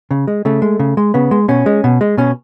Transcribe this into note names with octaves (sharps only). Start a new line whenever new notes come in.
C#3
G#3
C#3 A3
G#3
C#3
G#3
C#3 B3
G#3
B2 C#4
G#3
B2
G#3
B2 C#4